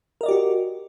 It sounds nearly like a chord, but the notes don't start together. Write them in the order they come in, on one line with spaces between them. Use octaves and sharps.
A#4 D#5 D5 G4 F#4